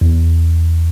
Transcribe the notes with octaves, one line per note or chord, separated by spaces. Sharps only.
E2